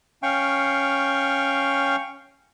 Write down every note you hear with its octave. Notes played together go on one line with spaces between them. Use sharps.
C#4 F5 G5 C#6